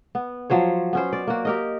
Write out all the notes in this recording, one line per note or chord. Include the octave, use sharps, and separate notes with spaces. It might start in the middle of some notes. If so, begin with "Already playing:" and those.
B3
F3 F#3 C5 C#5
B3 C#4 C5
D5
A#3 F#4
G4 A#4 D#5